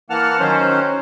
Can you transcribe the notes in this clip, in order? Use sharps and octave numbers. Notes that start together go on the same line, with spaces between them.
E3 A#3 F#5 A5 F6
D#3 F#3 C#4 C5